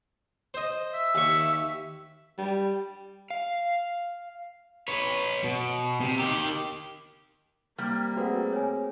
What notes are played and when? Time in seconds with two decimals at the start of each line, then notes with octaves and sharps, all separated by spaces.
0.54 C5 D#5
0.94 E5
1.15 D#2 C#6
2.38 G3
3.30 F5
4.88 B4 C#5
5.44 B2
6.01 C3
6.20 D#3 G4
7.78 C3 G3 A#3 F6
8.16 A3 C4 F#4 G#4 B4 F#5
8.53 C#5 G#5